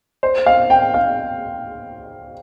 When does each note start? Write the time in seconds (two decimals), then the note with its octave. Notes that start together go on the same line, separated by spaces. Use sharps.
0.23 C5
0.46 F5
0.70 G5
0.94 F5